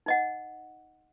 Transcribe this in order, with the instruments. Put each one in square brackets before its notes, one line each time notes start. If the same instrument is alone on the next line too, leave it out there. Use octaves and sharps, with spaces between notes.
[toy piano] D#4 D#5 F#5